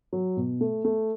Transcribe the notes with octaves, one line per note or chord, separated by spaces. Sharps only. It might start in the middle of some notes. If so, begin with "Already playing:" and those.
F#3
B2
A3
A3